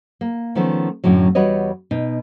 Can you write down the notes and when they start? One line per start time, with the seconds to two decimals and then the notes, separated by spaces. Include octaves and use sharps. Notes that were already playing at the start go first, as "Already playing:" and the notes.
0.21 A#3
0.55 D#3 F3 A3 B3 C#4
1.04 F#2 A2 D3 F#3
1.35 E2 G3 F#4 B4 C#5 D#5
1.91 B2 D#4